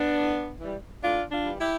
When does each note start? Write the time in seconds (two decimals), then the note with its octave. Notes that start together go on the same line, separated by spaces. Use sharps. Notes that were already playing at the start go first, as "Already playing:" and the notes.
Already playing: B3 D4
0.18 A2
0.61 E3 G3
1.02 A2 D4 F4
1.31 D4 F4
1.45 E3 G3
1.60 E4 G4